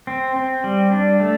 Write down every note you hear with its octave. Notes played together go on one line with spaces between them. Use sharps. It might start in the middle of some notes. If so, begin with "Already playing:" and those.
C4
C4
G3
D4
A3